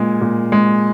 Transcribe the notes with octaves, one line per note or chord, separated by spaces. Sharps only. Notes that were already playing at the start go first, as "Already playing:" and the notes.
Already playing: A#2 G#3
A#2
G#3